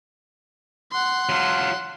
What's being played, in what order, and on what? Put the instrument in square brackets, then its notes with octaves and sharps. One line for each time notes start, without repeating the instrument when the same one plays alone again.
[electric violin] F#5 C6
[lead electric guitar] F#3 F4